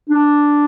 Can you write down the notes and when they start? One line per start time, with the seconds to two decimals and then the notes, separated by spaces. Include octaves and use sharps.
0.10 D4